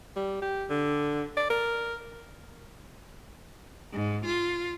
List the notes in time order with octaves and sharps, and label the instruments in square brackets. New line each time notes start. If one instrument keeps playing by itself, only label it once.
[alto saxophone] G3
G4
D3
D5
A#4
[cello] G#2
F4